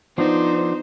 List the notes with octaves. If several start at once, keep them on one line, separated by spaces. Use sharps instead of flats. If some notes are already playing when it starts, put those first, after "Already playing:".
F3 B3 D4 D#4 C5